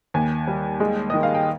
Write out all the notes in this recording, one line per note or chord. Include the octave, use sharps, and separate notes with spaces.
D#2 G#5
G3
G#3
D#3 D#5
F5
G5